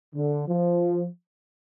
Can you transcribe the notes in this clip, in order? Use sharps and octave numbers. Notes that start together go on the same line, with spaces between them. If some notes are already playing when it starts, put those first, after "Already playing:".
D3
F3